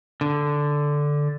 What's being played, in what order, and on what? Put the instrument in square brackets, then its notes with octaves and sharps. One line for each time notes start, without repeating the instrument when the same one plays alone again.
[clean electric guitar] D3